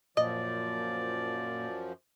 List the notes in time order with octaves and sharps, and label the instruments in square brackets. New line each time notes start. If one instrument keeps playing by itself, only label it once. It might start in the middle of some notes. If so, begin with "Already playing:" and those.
[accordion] F#2 F3 [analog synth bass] A#2 [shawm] D5 [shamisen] D#5